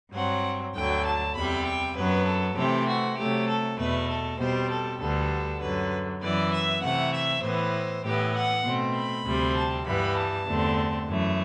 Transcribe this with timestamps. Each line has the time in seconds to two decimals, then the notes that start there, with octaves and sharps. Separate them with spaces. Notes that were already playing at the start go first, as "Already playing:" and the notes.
0.13 G2 F#3 C4 F#5
0.74 D2 D3 F#3 G5
1.04 A5
1.34 E2 C3 G3 B5
1.65 G5
1.95 F#2 F#3 B3 B4
2.26 A4
2.56 C3 E3 A3 C4 G4
2.87 F#4
3.17 C3 F#3 A3 G4
3.47 A4
3.78 E2 B2 A3 B4
4.08 A4
4.38 B2 G3 C4 C5
4.69 A4
4.99 D2 D3 G3 B3 A4
5.60 F#2 D3 F#3 B4
6.21 F#2 E3 B3 D5
6.52 E5
6.82 C3 E3 A3 F#5
7.12 E5
7.42 A2 E3 B3 C5
8.03 A2 E3 B3 G4
8.34 F#5
8.64 B2 A3 C4
8.95 B5
9.25 D2 C3 G3 C4
9.55 A5
9.86 G2 E3 G3 B3 B5
10.16 A5
10.46 E2 D3 A3 C4
11.08 F#2 E3 A3